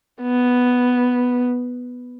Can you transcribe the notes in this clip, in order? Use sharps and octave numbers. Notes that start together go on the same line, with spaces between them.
B3